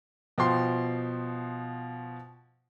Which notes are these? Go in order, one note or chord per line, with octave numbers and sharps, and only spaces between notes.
B2 F3 G5 C6